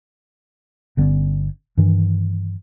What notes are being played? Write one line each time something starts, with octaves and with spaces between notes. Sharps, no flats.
G1 D3 B3 C#4
G2 D#3 E3